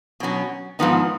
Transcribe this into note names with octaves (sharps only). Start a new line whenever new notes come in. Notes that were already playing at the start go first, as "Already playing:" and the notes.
B2 F#3 C#4
G#2 F3 B3 D#4